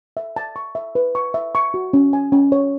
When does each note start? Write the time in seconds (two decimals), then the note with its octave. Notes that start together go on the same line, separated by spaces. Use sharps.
0.17 E5
0.36 A5
0.56 C#6
0.75 E5
0.95 B4
1.15 C#6
1.34 E5
1.55 C#6
1.74 F#4
1.93 C#4
2.13 G#5
2.32 C#4
2.52 C#5